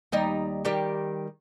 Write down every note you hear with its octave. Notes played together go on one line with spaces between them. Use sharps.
D#2 G3 D#4
D#3 G3 G4